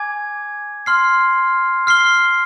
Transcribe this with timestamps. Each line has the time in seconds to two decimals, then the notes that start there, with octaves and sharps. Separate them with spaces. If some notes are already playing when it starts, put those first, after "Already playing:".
Already playing: G#5 D6 G#6
0.86 C6 F6 C7
1.87 F6 C7 G7